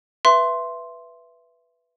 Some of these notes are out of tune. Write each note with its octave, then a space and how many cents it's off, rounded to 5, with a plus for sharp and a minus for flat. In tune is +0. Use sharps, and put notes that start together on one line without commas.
B4 +0 E5 +20 C6 +0